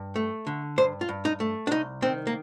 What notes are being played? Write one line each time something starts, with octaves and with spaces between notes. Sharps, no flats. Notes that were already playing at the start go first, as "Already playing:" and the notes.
Already playing: G2
A3
D3
G2 C5
F4
G2
D#4
A3
D4
C2 D#4
D#3 C4
A#3